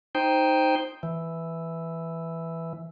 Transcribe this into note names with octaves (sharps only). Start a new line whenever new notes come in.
D#4 C5 G5
E3